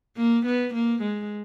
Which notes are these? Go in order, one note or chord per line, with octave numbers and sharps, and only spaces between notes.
A#3
B3
A#3
G#3